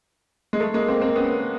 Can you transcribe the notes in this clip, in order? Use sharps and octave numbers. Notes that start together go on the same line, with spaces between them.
G#3
A3
G#3 A#3
A#3 C4
A#3 C4
B3 C#4